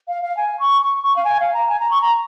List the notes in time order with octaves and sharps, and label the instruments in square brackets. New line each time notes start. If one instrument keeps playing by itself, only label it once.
[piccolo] F5
F5
G#5
C#6
C#6
C#6
F5
G#5
F5
A#5
G#5
A#5
C#6
A#5